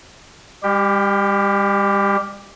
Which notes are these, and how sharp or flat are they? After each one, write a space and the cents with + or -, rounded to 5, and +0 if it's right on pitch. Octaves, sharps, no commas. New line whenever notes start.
G3 +40 G4 +0